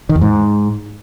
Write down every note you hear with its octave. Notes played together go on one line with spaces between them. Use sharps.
D#3
E2
G#2